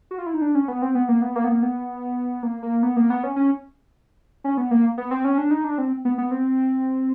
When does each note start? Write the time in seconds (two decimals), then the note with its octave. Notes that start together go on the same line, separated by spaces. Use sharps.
0.11 F#4
0.18 F4
0.26 E4
0.34 D#4
0.42 D4
0.55 C#4
0.68 B3
0.82 C4
0.95 B3
1.09 A#3
1.22 B3
1.36 A#3
1.44 B3
1.49 A#3
1.63 B3
2.43 A#3
2.63 A#3
2.83 B3
2.96 A#3
3.10 B3
3.23 C#4
3.36 C#4
4.44 C#4
4.57 B3
4.71 A#3
4.98 B3
5.11 C4
5.25 C#4
5.38 D4
5.51 D#4
5.64 D4
5.78 C4
6.05 B3
6.18 B3
6.31 C4